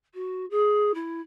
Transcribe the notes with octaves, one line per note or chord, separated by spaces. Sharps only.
F#4
G#4
E4